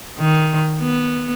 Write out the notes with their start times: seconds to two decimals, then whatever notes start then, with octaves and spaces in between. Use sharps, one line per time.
0.19 D#3
0.80 B3